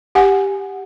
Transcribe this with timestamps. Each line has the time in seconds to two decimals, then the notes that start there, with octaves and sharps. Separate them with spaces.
0.15 G4 F#5 G#5